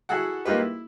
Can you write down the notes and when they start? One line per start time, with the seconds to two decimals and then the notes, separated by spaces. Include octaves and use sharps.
0.09 E4 F#4 G#4 A4 F#5
0.45 A#3 D#4 F4 G4 B4
0.59 E4